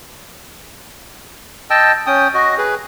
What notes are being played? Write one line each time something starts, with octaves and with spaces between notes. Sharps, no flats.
D#5 G5 A5 E6
C#4 G5 D#6
F#4 D#5
G#4 B4